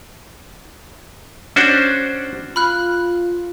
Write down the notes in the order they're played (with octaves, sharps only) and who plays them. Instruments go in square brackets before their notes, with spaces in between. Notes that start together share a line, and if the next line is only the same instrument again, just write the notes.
[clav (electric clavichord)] C#4 D4 F#4 C5
[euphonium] F4 [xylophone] B5 F6 F#6